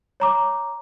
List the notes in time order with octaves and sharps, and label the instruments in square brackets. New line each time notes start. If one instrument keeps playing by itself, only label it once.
[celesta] C#5 A#5 D6